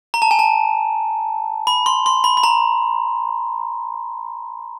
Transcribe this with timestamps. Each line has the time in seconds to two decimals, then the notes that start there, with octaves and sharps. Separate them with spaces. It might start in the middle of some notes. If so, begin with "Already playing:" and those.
0.14 A#5
0.22 A5
0.31 G#5
0.39 A5
1.67 B5
1.86 C6
2.06 C6
2.24 B5
2.37 B5
2.43 A#5